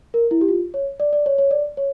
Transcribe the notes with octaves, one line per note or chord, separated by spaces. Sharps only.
A#4
E4
G4
F4
C#5
D5
D5
C#5
C#5
D5
C#5